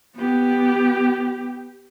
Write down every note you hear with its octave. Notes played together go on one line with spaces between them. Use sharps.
B3 G4